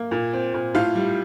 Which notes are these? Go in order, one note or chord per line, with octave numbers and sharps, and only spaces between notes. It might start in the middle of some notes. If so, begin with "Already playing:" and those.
Already playing: A#3
A#2
C4
A#2
A2 F4 F5
G3